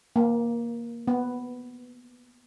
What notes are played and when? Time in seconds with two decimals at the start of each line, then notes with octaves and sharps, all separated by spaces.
0.16 A#3
1.08 B3